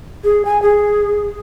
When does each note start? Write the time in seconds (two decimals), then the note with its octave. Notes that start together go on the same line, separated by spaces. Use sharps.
0.24 G#4
0.45 G#5
0.62 G#4